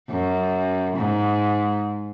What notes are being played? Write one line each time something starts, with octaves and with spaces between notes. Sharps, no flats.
F#2
G#2